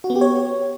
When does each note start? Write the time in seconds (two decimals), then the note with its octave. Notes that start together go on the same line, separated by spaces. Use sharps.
0.04 F#4
0.10 B3
0.16 G4
0.21 C#5